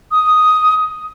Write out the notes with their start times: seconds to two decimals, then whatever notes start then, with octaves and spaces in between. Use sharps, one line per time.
0.11 D#6